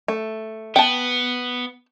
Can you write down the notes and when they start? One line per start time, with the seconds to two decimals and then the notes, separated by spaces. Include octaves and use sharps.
0.08 A3
0.76 B3 G5 A5